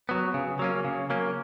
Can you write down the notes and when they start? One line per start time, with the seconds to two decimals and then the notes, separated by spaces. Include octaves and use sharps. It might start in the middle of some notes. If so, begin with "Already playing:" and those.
0.09 F#3 B3
0.34 C#3
0.59 F#3 A#3 C#4
0.85 C#3
1.10 F#3 A#3 C#4